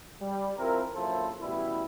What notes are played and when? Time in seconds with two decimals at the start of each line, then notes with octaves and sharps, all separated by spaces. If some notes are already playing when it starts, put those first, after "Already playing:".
0.21 G3
0.57 F3 C4 E4 A#4
0.94 A#1 F#2 A#3 E4 A4 C5
1.41 A1 B2 G3 E4